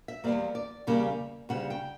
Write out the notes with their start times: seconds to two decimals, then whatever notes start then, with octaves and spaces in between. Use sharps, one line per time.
0.08 E5
0.24 E2 C#3 G3 A#3 D5
0.55 D5
0.87 E2 C#3 G3 A#3
1.49 D2 C#3 G3 F#5
1.70 G5